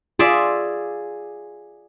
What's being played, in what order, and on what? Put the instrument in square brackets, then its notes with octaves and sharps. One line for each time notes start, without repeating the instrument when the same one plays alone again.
[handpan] F4 [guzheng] G#4 D5 E5